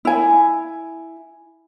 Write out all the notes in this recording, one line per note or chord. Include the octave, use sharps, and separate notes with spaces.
E4 G#5